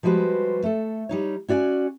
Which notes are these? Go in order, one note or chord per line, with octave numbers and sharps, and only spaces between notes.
F3 G3 G#3 F#4 B4 C5
A3 A4
G3 D#4 C#5
C#4 F#4 D5 E5 G#5